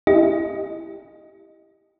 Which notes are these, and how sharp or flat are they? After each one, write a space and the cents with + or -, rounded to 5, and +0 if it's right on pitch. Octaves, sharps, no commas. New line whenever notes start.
E4 +0 G4 +0 D#5 +0